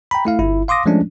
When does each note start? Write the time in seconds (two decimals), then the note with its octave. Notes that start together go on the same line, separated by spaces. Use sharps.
0.11 G5 A#5 B5
0.25 A3 E4 F5
0.39 G1 E4
0.68 F5 C6 D6 D#6 A#6
0.86 F3 G#3 A3 C#4 D4